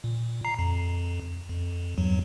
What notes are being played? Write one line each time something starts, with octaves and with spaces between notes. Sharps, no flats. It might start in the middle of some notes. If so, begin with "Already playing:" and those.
A#2
A#5 C7
F2
F2
E2 G2 F#3